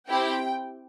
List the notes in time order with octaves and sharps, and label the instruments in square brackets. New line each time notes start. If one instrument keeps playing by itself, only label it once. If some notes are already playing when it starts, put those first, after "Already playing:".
[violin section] C4 E4 G4 G5